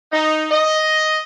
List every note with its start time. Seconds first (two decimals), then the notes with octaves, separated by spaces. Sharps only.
0.12 D#4
0.51 D#5